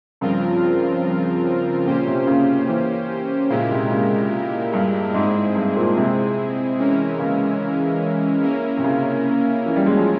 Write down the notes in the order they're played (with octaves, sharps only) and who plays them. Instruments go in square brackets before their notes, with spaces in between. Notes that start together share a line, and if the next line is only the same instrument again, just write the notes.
[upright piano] G2 [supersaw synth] C#3 F3 C4 F4 A#4
[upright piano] G2
[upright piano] A#2 [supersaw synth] A#3 C#4 G4 C5
[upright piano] C3
C#3
E3
[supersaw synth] A#2 G#3 E4 G4 A#4 [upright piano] C#3
[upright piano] C3
C#3
G2
[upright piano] G#2 [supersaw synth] G#3 C4 E4 G#4
[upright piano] G2
A#2
C3
[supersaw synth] E3 G#3 C#4 E4 A#4
[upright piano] C#3
[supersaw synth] A#3 C#4 E4 A#4
[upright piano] C3
C#3
E3
G3
G#3
F3